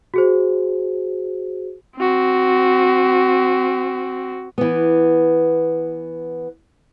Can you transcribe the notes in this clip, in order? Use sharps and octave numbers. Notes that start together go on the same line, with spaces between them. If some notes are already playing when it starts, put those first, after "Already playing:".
F#4 G#4 C5
C4 F#4
E3 B3